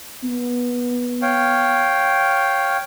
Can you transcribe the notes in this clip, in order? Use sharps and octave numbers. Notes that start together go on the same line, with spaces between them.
B3
C#5 F5 G5